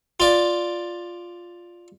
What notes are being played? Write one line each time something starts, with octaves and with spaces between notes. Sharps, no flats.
F4 D5